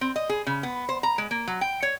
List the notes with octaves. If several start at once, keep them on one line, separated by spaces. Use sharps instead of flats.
C4
D#5
G#4
C#3
B3
C5
A#5
G#3
A#3
F#3
G5
C#5